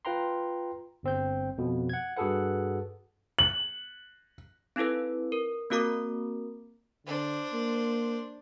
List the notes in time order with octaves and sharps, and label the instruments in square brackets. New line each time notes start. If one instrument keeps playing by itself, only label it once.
[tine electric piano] F4 B4 G5 A#5 C6
G1 C4 G6
F2 B2
F#5 G#6
G2 F#4 G#4 A4 B4 F#5
[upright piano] F#7
[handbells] C4 D#4 E4 A4 B4
A#4
A#3 C4 F#4 A#4 A#5 D6
[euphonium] D3 [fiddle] D4 C5
[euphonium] A#3